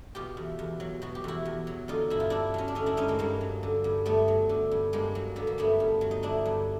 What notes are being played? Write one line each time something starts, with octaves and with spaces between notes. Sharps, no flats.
B2 F4 G4
E2
E2
F#3
B2 F#4
G4
E2 E4 F#4
E2
F#3
D3 D#4 F4
G2 E4
F4
G2 D4 E4
F#3 C#4
D4
D3 C#4 D#4
D4 E4
G2 C#4 D#4
G#3 A#3
G2 G#3 A#3
F#3
D3
G2
G2 A3 B3
F#3
D3
G2
G2 G#3 A#3
F#3
D3 B3
A#3
G2 A3 B3
G2
F#3
D#4
D3 D4 E4
G2